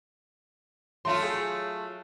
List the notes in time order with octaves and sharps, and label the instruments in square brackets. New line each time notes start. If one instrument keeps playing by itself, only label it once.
[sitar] F#3 A3 F4 [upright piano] C6
[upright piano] G#4